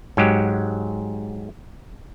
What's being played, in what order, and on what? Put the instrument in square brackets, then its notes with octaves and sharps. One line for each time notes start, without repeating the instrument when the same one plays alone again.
[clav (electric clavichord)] G#2 F#3 G#3 G4